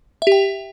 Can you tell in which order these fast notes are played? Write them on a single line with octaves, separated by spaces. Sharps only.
E5 G4 G5